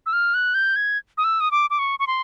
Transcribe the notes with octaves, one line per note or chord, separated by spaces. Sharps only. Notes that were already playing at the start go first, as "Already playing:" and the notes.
E6
F6
F#6
G6
G#6
D#6
E6
D#6
D6
D6
C#6
C#6
C6